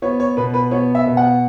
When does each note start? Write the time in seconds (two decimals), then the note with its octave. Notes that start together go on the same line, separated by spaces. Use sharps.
0.02 B3 C#5
0.20 C#5
0.37 B2 B4
0.54 B4
0.71 B3 C#5
0.95 E5
1.06 B2
1.17 F#5